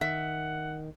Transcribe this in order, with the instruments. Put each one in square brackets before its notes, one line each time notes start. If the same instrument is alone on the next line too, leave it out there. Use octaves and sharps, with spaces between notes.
[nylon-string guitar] D#3 [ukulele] E5 [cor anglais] F#5